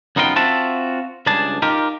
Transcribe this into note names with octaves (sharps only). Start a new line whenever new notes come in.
F#2 B3 D#4 F4 A#4 G5
C4 F4 F#4 E5 A5
C#2 G2 D4 G#4 A5
D#4 F4 G4 A#4